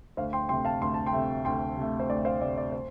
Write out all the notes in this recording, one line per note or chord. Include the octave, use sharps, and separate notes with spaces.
D2 C5 F5
G5 C6
C3 A3 G5 C6
F5 A5
D2 C6
A5
G5 C6
C3 A3
D2 G5 C6
C3 A3
C5
D2 D5
C5 F5
C3 A3 D5
D5
C5